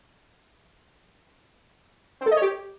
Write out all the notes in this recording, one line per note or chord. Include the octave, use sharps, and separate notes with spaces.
C4
A4
D#5
C#5
G4